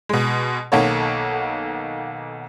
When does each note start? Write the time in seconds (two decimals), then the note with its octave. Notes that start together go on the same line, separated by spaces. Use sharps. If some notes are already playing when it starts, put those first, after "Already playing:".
0.09 B2 G#3
0.72 B1 D#3 A#3 B3 A4 C#5